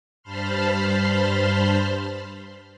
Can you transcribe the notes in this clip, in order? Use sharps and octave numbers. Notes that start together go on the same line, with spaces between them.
G2 C5 A5 B5 C6 F6